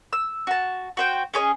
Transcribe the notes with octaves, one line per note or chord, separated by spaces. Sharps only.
E6
F#4 A5
F#4 C5 G5
C#4 G#4 C#5 D#5